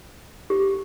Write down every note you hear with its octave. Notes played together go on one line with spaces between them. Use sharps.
G4